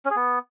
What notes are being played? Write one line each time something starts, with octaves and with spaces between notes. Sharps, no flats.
C#4
G#4
B3